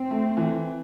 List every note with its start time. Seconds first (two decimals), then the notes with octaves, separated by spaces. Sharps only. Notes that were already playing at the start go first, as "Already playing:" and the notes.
Already playing: C4
0.11 A3
0.37 E3